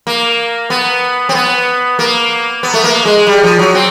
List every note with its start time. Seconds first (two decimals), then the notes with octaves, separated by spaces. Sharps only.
0.07 A#3
0.70 B3
1.29 C4
1.35 B3
1.99 A#3
2.63 B3
2.74 A3
2.84 A#3
3.05 G#3
3.27 G3
3.43 F3
3.59 F#3
3.75 C4